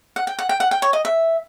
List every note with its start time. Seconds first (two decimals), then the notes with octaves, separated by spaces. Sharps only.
0.16 F#5
0.27 G5
0.39 F#5
0.49 G5
0.60 F#5
0.71 G5
0.82 C#5
0.93 D#5
1.05 E5